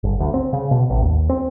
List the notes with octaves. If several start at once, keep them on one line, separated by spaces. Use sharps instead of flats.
G1
D2
C4
C#3
B2
A1
D#2
C4